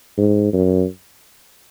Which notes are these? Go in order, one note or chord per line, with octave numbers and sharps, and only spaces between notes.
G#2
F#2